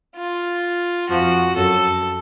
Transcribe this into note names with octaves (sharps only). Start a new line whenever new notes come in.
F4
F2 F3 F#4
F#2 F#3 A4